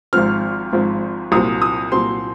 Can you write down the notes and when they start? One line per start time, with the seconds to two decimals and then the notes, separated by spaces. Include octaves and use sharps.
0.13 G#1 G#2 F3 C4 F6
0.73 G#1 G#2 F3 C4
1.32 C2 A#2 F#3 C4 D#6
1.62 D#6
1.92 C2 A#2 F#3 C4 C6